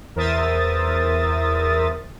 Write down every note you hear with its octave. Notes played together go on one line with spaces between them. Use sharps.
E2 A#4 C5 E5 D#6 A6